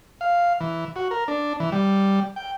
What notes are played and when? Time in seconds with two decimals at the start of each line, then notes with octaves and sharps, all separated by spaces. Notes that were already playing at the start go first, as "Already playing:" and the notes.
0.21 F5
0.60 E3
0.96 F#4
1.11 A#4
1.28 D4
1.60 E3
1.72 G3
2.36 G5